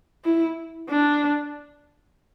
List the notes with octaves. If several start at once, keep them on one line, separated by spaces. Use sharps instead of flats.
E4
D4